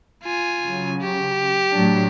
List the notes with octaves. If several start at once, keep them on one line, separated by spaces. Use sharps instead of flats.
F4 G#5
C#3 F#3
G4
A2 F#3 D4